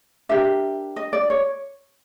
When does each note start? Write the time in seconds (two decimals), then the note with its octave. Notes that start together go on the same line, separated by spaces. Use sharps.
0.29 D4 G4 A#4 E5
0.96 D#5
1.13 D5
1.30 C#5